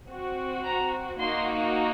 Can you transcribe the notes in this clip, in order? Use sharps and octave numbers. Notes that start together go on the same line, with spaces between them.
C4 F#4
A#5
A#3 D#4 F#4 C6